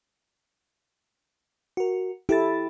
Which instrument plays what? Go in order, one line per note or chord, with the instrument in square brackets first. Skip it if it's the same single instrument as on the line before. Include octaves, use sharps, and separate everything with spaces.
[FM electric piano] F#4 A#4
[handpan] E4 [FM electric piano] G4 A4 A6